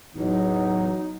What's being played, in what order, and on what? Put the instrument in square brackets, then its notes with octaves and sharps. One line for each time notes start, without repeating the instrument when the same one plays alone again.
[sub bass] D1 [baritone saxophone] E2 [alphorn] F#3 [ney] D#4